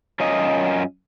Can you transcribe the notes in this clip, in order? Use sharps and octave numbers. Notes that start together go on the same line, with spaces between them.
F#2 C#4 F4 A#4 D#5